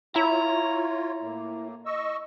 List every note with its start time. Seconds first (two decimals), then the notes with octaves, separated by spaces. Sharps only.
0.16 E4 F4 C#5 A#5
1.21 A2 A#3
1.86 D#5 C#6 E6